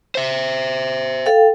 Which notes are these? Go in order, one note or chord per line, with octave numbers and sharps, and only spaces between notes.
C5 E5
A4 F5 G5